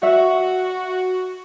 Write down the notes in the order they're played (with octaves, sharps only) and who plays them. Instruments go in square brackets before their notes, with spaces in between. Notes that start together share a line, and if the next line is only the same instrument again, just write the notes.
[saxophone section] F#4 [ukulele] E5